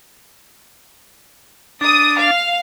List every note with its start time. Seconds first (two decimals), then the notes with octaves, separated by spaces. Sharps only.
1.81 D4 D#6
2.17 F5